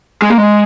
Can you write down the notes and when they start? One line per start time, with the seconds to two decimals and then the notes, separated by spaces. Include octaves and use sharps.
0.22 G#3
0.30 A#3
0.38 G#3